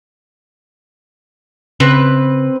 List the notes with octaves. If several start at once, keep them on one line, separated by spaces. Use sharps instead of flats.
C#3 C4 B4